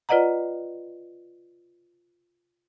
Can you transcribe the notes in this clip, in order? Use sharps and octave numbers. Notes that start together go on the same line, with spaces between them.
F4 B4 D5 D#5 F#5 A#5